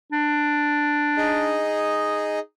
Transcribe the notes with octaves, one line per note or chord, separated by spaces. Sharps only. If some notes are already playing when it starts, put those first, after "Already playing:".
D4
D#4 G#4 D#5